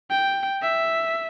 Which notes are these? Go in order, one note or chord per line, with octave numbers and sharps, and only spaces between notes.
G5
E5